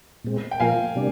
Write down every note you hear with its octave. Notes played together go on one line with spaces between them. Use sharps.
A#2 G#3 C4
G5
A#2 F3 A#3 F4 A#4 F5 G#5
C3 G3 A#3 D4